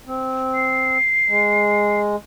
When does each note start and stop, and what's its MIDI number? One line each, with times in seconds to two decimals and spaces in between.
0.07 0.98 60
0.55 2.00 96
1.28 2.16 56